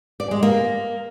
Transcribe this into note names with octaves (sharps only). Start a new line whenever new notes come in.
D5
G#3
A#3